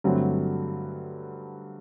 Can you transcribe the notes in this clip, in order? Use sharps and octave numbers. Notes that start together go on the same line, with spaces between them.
G2 D3 F#3 A3 C4